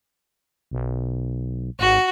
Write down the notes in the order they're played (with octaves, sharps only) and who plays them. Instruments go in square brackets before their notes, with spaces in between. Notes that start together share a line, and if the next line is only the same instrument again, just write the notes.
[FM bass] B1
[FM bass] G#1 [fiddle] F#4